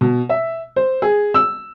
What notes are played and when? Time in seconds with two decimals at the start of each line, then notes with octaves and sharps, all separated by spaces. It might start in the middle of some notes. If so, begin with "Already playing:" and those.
0.01 B2
0.29 E5
0.76 C5
1.02 G#4
1.34 E6